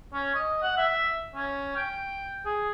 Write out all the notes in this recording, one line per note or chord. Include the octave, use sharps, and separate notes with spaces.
C#4
D#5
F#5
E5
C#4
G5
G#4